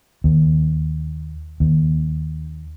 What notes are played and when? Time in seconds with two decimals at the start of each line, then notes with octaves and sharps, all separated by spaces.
0.24 D#2
1.60 D#2